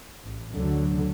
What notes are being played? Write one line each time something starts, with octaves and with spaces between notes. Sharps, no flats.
A1
D2 D3 F#3